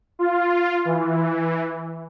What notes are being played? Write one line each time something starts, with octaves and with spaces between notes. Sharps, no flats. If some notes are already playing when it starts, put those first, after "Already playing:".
F4
E3